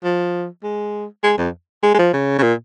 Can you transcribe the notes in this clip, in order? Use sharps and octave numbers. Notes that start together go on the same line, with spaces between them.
F3
G#3
G#3
F2
G#3
G#3
F3
C#3
C#3
A#2